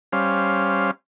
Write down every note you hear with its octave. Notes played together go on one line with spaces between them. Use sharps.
G3 C#4 C5 F5